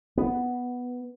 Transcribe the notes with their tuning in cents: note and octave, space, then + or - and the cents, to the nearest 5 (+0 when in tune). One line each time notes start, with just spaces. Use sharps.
B3 +0